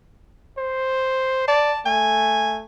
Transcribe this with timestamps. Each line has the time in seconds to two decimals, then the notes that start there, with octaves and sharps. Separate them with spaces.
0.58 C5
1.48 D5 A5
1.86 A3 G#5